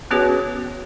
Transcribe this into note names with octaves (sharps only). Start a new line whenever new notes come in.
B3 C#4 F#4 G#4 B4 C#5